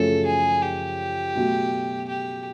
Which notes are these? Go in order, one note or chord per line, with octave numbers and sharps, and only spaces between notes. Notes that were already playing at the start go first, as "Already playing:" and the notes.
Already playing: F#2 C#3 F3 A3 C#4 A4
G#4
G4
B2 F#3 A3
G4